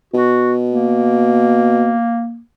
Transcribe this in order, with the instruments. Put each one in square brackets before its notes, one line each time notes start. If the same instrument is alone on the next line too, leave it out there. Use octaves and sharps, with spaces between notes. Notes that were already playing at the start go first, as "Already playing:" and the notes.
[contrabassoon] B2 [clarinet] F#4
[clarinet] A#3